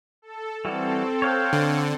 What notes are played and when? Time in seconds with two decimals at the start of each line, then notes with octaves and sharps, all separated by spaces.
0.22 A4
0.65 E3 G3 C4 F#4 A4
1.22 C#5 F5 G5
1.53 D3